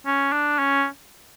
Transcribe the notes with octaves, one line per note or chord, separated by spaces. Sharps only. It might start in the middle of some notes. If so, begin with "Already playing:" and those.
C#4
D4
C#4